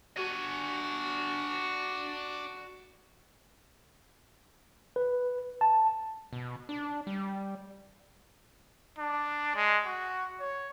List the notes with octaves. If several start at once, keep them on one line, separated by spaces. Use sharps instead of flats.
D4 F#4 G#5
B4
A5
B2
D4
G3
D4
G#3
F#4
C#5